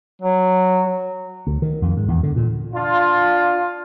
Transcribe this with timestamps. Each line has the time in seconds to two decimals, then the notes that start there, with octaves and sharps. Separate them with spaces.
0.22 F#3
1.47 D2
1.62 D#3
1.82 F2
1.97 G#2
2.08 E2
2.23 D3
2.36 A#2
2.74 D4 F4